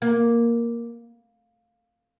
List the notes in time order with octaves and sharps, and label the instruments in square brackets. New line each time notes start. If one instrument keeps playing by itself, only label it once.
[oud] A#3